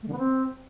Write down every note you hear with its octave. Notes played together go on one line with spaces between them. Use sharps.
A3
D3
B3
C4